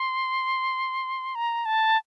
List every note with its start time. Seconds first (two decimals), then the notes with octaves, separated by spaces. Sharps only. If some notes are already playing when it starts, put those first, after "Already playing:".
Already playing: C6
1.35 A#5
1.65 A5